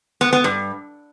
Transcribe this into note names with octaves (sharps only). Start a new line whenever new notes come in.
B3
B3
G2